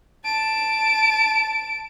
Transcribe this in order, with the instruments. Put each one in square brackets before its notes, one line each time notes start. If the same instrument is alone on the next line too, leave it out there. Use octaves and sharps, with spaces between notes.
[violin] A5 D7